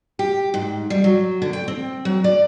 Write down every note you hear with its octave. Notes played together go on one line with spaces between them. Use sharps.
G4
G#2
G3
F#3
D3
G5
C4
F#3
D5